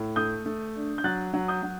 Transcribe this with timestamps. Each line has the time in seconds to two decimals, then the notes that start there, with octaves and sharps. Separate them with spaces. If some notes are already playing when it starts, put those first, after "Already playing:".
Already playing: A2
0.16 A3 D#6 G6
0.46 A3
0.76 D4
0.98 G6
1.04 F#3 F#6 A6
1.34 F#3
1.48 D#6 G6
1.63 F#3